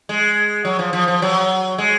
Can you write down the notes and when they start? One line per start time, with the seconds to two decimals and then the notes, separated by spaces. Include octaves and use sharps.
0.09 G#3
0.65 F#3
0.79 F3
0.93 F3
1.08 F3
1.22 F#3
1.78 G#3